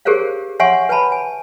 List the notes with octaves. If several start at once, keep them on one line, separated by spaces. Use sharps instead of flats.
G4 G#4 A#4 C5 C#5 F5
C#5 E5 F#5 G#5 C6 C#6
B4 C#5 G#5 A5 B5
G#5